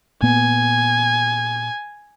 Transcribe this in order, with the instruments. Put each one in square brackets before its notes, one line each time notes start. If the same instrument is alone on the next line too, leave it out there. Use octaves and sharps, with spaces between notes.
[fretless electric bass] A#2 A#3 B3 [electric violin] G#5